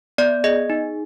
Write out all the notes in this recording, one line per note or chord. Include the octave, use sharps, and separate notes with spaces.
B3 D5
G#4 D#5
D#4